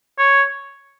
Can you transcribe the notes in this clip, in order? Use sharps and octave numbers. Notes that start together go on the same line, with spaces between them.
C#5